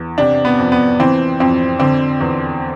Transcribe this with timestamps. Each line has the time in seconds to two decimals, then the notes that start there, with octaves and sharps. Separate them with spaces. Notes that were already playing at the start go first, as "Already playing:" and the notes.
Already playing: E2
0.18 C3 D4
0.45 B3
0.59 F2
0.72 B3
1.00 E3 C4
1.40 F2 C4
1.80 D3 C4
2.21 E2